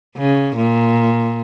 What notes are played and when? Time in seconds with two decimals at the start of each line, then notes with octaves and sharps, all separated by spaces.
0.17 C#3
0.56 A#2